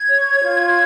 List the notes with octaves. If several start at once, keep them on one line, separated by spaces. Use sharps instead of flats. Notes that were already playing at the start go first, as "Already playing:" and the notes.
Already playing: G#6
C#5
F4